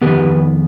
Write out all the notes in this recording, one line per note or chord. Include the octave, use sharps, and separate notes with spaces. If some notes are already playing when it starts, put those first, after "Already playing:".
F2 D#3 B3 G4 B4